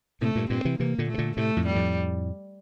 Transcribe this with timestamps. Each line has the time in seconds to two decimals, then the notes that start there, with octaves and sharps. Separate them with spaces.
0.21 A2 C3 A3
0.35 G2 A#2
0.50 G2 A#2 C4
0.65 C3 E3
0.79 C3 E3 A#3
0.98 A#2 D3
1.09 A3
1.14 C3
1.18 A#2 D3
1.37 A2 C3 A3
1.57 F2 A2
1.66 G3
1.75 F2 A2